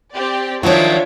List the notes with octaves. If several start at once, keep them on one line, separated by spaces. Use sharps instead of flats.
C4 G4 D5
D#3 F3 F#3 D4 F4 C#5 E5 D7